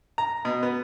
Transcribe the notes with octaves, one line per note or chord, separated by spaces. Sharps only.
A#5
B2
B3